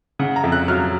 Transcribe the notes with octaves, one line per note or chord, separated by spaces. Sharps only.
C#3 F#5
A#5
F2
F#6
F#3 F6